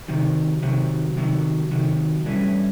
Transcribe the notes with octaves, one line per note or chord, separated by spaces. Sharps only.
C3 D#3 F#3
C3 D#3 F#3
C3 D#3 F#3
C3 D#3 F#3
G2 E3 A3 C#4